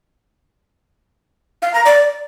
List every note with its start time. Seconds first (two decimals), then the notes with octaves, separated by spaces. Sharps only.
1.62 F5
1.74 A#5
1.85 D5